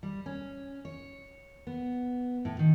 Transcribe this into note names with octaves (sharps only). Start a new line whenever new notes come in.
G3
C#4
C#5
B3
A2
D#3